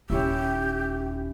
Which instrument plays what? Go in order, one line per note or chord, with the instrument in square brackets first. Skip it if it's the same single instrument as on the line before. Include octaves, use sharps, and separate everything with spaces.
[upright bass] D#1 D#3 [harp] C#4 E4 E5 [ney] G4